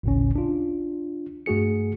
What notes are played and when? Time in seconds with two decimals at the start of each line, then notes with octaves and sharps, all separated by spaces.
0.03 G#1 D2 A2 C#3 C#4
0.36 D4 F4
1.46 G2 A3 F#4 G#4 C#7